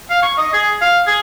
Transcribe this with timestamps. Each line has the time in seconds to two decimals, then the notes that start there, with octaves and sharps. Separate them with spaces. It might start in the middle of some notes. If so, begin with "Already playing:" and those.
0.10 F5
0.22 C#6
0.38 D#5
0.53 G#4
0.81 F5
1.07 G#4